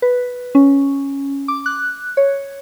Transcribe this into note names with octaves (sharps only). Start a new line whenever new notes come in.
B4
C#4
D6
F#6
C#5